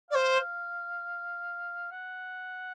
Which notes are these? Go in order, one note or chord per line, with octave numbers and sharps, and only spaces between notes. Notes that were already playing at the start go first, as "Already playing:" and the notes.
C5 D5 F5
F#5